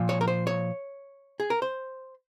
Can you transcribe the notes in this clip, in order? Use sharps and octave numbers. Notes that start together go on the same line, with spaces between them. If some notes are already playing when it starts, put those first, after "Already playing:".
Already playing: A#2 F3
C#5
A#4
C5
C#5
G#4
A#4
C5